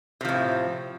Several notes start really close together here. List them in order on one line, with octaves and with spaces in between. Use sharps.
C3 F3 A2